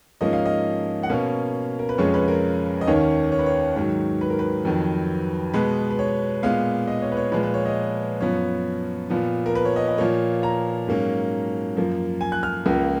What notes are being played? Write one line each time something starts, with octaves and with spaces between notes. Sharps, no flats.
G#2 F3 A#3 C#4 D#5
F5
D#5
F#5
B2 A#3 C#4 F5
A#4
B4
F2 C#3 G#3 C#4 C#5
B4
A#4
D#5
D#2 D#3 A#3 C#4 C#5
C#5
B4
C#5
G#2 D#3 F#3 C#5
B4
A#4
B4
F2 D#3 F#3
B2 G#3 B3 B4
B4
C#5
A#2 G#3 B3 F5
D#5
C#5
B4
C#5
A#2 F3 G#3 B4
B4
C#5
D#5
F#2 F3 B3 C#5
A#2 F3 B3
A#4
B4
C#5
D#5
D#5
A#2 F3 A#3 C#5
A#5
G#2 F#3 A#3 C#4
F#2 F3 A#3
G#5
F#6
F6
C#2 C#3 F3 A#3